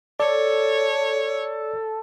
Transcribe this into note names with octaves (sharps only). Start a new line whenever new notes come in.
A4 C#5 D5